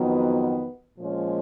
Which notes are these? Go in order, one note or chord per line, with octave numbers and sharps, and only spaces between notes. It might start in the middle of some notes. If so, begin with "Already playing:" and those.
Already playing: F2 D#3 F#3 B3
A#2 F3 G#3 C#4